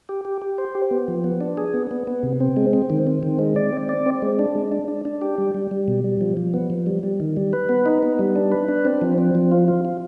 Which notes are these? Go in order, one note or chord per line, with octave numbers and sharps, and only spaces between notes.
G4
G4
G4
C5
G4
B3
F3
B3
D4
G#4
B3
B3
B3
C3
C4
G#3
C4
D#3
C4
D#3
G#3
D5
C4
D5
C4
G#3
D4
G#3
D4
D4
D4
G4
G3
G3
G3
B2
G3
F3
F3
B3
F3
G3
G3
D#3
G3
B4
B3
D#4
B3
G3
D4
B4
D4
C4
F3
C4
F3
F4
F4
F4